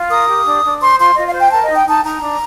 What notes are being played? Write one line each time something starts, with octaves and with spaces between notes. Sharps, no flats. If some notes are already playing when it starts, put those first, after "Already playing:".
Already playing: F4
A#4 D#6
G4
D4
D4
C5 C6
F4 C6
F4 D#5
F5
C5
G5
A#4 A5
D#5
D#4
G5
D#4 A5
D#4 A#5
D4